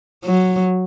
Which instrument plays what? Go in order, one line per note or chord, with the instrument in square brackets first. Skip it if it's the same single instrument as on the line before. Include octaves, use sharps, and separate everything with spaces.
[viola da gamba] F#3